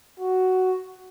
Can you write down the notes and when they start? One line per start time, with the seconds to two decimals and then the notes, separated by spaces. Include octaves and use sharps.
0.20 F#4